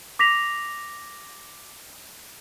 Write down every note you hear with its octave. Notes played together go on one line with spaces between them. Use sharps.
D6 A#6 B6 F7